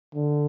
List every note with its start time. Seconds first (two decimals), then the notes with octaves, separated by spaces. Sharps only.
0.15 D3